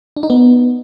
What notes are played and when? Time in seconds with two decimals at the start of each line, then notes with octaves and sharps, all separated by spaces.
0.17 D4
0.23 D#4
0.30 B3